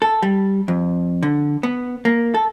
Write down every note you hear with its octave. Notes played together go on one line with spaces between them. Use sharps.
A4
G3
F2
D3
B3
A#3
A4